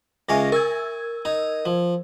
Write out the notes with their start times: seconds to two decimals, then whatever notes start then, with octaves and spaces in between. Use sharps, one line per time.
0.29 C#2 C#5 E5 F5 G#5 A#6
0.52 A#4 C#6 E6 G#6
1.25 D#4 A#5
1.65 F3